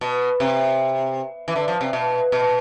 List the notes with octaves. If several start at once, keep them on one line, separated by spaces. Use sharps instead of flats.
B2
C3
E3
D3
F3
C3
B2
B2